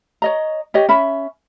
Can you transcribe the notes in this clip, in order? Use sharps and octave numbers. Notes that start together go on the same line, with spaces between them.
C#5 D#5 A#5
G4 C#5 D#5
C#4 E5 B5